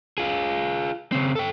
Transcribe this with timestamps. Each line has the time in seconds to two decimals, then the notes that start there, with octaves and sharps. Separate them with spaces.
0.18 F4 G#4
1.12 C#3 C4
1.35 A4 G5